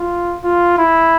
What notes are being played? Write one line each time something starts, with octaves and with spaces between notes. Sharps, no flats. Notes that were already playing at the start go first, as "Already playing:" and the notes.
Already playing: F4
F4
E4